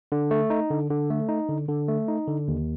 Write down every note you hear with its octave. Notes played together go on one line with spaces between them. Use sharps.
D3
A3
D#4
D3
D3
A3
D#4
D3
D3
A3
D#4
D3
D#2